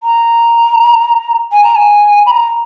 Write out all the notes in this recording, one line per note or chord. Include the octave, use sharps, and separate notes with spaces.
A#5
G#5
A#5
G#5
B5
A#5